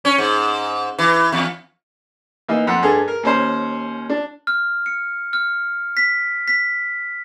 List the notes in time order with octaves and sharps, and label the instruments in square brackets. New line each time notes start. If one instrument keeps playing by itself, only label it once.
[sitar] C#4
G#2
E3
E2
[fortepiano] E3 A#3 D#4
F2 F#5
G2 G#4 A4
A#4
D#2 C#4 C5
D4
[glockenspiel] F6
C#7
F6
B6
B6